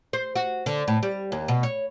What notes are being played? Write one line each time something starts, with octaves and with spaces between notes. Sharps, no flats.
C5
F#4
D3
A2
G3
D#2
B2
C#5